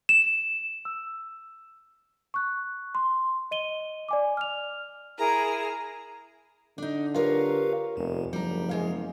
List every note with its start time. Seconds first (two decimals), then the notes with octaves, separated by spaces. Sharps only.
0.09 E7
0.85 E6
2.34 C#6 F#6
2.95 C6
3.51 D#5 D#7 G7
4.09 D5 G#5 D6
4.37 F6 F7
5.18 E4 G#4 A#4 A#5
6.78 D3 D4 D#4
7.14 F4 G4 A#4 B4 C#5 F5
7.97 F1 E2
8.33 F#1 F3 G3 A#5
8.69 E2 G#3 F5